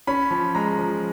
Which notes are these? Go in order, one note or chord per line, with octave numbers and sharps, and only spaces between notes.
C#4 B5
F3
G#3 A#5
F3